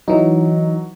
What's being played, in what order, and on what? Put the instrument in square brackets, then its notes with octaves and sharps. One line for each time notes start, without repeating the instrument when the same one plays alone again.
[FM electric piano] E3 D#4 [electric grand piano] F#3